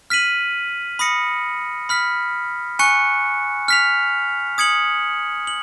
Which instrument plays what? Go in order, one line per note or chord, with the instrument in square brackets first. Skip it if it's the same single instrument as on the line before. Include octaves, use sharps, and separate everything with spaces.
[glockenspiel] F6 B6 D#7 F#7
B5 D#6 A#6 C#7
B5 F6 B6
G#5 C#6 F#6 C#7
F6 B6 F7
D#6 G#6 C#7 F#7
F#7